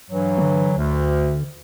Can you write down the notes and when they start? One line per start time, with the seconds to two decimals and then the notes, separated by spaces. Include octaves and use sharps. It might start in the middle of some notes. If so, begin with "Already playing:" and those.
0.11 G2 E3 F#3
0.38 D3
0.77 D2